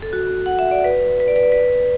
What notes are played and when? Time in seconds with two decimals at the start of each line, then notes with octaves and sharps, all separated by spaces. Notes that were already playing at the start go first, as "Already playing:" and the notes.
0.02 A4
0.13 F#4
0.46 F#5
0.59 E5
0.71 D5
0.84 B4
1.20 B4
1.28 D5
1.36 B4
1.43 D5
1.52 B4